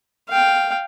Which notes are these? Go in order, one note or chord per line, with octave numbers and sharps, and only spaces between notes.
F5 G5